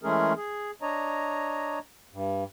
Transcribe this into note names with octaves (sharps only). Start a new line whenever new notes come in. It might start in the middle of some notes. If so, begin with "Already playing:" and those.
E3 G#3 A3 C#4 G#4 A#4
G#4
D4 C#5 D#5 A#5
G2